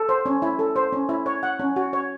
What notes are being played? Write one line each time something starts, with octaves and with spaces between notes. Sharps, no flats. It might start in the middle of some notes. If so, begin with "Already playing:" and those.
Already playing: A4
C5
C#4
E4
A4
C5
C#4
E4
C#5
F#5
C#4
F#4
C#5